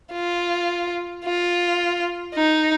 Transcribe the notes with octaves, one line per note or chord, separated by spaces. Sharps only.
F4
F4
D#4